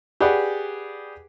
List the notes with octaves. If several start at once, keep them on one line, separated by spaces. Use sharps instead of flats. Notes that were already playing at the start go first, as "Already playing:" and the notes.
G4 G#4 B4 D5 F#5